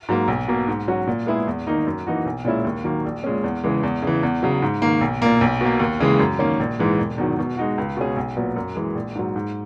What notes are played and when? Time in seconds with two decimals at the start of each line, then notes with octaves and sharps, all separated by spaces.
0.09 G#2 F#3 A#3
0.28 B1
0.48 B2 A#3
0.68 G#2
0.88 F#3 C#4 F#4
1.07 A#2
1.26 G#3 B3 E4 G#4
1.47 E2
1.67 D#3 A#3 D#4
1.87 F#2
2.06 E3 A#3 D#4 F#4
2.26 B1
2.45 A#2 G#3 C#4 E4
2.64 D#2
2.84 D#3 F#3 A#3
3.05 A#1
3.24 A#2 G#3 C#4
3.44 E2
3.64 C#3 E3 G#3
3.83 E2
4.02 C#3 E3
4.23 E2
4.43 C#3 F#3
4.62 G#2
4.82 D#3 A#3
5.01 B1
5.22 A#2 A#3
5.41 B1
5.61 B2 A#3
5.80 D#2
6.00 C#3 E3 G#3
6.19 F#2
6.39 D#3 A#3 C#4
6.60 A#1
6.79 G#2 E3 G#3
6.98 E1
7.18 E2 D#3 F#3
7.39 B2
7.57 G#3 D#4 F#4
7.78 C#2
7.97 B2 G#3 C#4 G#4
8.16 B1
8.37 A#2 F#3 B3
8.56 F#2
8.76 E3 G#3
8.95 A#1
9.15 G#2 F#3
9.36 G#2